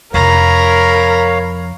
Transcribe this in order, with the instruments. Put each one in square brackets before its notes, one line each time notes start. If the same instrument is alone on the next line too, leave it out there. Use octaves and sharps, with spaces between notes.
[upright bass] F2 C3 [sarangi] A#4 [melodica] C#5 F5 [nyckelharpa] A#5 B5